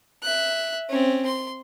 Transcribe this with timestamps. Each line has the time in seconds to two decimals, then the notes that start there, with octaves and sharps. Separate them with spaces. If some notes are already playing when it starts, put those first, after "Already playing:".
0.22 E5 F#6
0.89 C4 C#4
1.26 C6